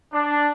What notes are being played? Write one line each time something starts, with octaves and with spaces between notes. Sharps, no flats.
D4